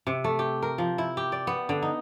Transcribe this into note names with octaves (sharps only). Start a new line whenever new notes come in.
C3
A3
G4
A#4
F3
E4
G4
D5
B3
D3
D#4